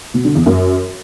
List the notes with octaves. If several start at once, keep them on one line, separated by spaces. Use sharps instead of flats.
B2
D3
E2
F#2